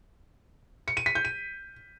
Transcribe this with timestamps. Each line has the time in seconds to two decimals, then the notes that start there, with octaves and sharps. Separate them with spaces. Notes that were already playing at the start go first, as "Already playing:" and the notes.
0.88 C#7
0.97 D#7
1.06 B6
1.15 G6
1.25 D#7